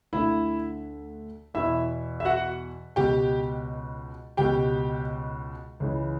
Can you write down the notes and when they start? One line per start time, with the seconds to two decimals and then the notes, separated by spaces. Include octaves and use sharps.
0.13 D2 D3 E4 E5
1.54 E2 B2 E4 E5
2.20 E5
2.25 F#4 F#5
2.96 C#2 B2 G4 G5
4.37 C#2 B2 G4 G5
5.80 C#2 C#3 E3